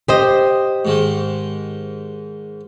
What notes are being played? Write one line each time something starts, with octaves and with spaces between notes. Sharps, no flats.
G4 C5 D#5
G#2 D#3 G#3